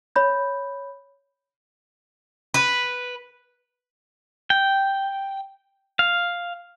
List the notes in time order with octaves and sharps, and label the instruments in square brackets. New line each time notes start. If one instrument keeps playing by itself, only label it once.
[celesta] C#5 B5 G6
[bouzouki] B4
[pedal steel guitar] G5
F5